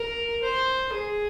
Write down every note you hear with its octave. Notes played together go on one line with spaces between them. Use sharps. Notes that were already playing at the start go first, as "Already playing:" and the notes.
Already playing: A#4
C5
G#4